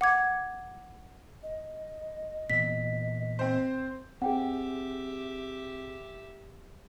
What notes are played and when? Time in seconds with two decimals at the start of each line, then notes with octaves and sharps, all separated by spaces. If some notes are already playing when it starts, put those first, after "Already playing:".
0.01 F#5 D6 G#6
1.43 D#5
2.50 A#2 E3 B3 B6
3.39 C4 C5
4.22 C4 G4 G#4 E5 F#5 G5